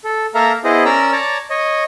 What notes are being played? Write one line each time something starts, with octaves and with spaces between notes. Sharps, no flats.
A4
A#3 A4 A#4 E5 F5 A#5
B3 E4 G#4 C5 D#5
C#4 A#4 D5 A#5 E6
C#5 D5 A5 A#5
C#5 D#5